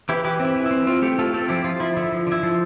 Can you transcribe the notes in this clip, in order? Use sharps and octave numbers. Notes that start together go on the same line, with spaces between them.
E3 E4 G4
E3 E4 G4
C4
E4
E3
E4
C4
C4 F4
A3 E4 G4
A3 F4 A4
C4 F4 A4
F3 E4 G4
F3 F4
F3 E4
D3 E4
F3
D3 E4
F3